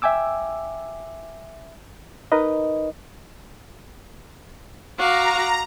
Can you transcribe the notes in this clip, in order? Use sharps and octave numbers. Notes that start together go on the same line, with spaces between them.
E5 G5 G#5 D6 E6
D#4 A#4 B4 D#5
F#4 F5 A#5 D6